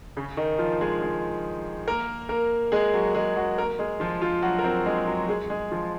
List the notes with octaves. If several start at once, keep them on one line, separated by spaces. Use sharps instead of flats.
C#3 C#4
D#3 D#4
F3 F4
G#3 G#4
G#3 G#4
A#3 A#4
A#3 A#4
G#3 G#4
F#3 F#4
G#3 G#4
F#3 F#4
A#3 A#4
G#3 G#4
F3 F4
F3 F4
F#3 F#4
A#4
C4 C5
G#3 G#4
F#3 F#4
G#3 G#4
G#3 G#4
F3 F4